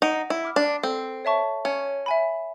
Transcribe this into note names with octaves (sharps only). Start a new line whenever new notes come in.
D#4 F#5
E4
B5 D6 F6
D4
C4 A4
C#5 E5 A5 C#6
C#4 C#5
E5 G#5 B5